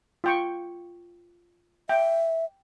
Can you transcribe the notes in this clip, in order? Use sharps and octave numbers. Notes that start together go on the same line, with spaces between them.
F4 G5 C#6
E5 G5